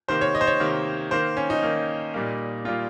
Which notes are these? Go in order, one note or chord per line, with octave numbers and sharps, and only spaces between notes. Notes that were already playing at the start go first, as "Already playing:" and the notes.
C3 D#3 A#3 C5
C#5
D#5
C5
C#5
C3 D#3 A#3
D#3 A#3 C5
C#4
D#4
D#3 A#3
A#2 G3 A#3
A#2 G3 A#3 F4